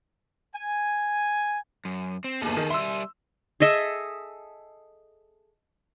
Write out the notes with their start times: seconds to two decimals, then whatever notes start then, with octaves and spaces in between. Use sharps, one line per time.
0.54 G#5
1.85 F#2
2.24 C4
2.42 G1 D#2 G#4 A4
2.57 D#3
2.70 G3 E5 C6 E6
3.60 G#4 A4 D#5 E5